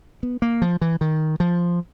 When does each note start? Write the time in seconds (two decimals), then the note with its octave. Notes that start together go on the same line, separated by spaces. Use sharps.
0.23 B3
0.42 A#3
0.62 F3
0.81 E3
1.01 D#3
1.40 F3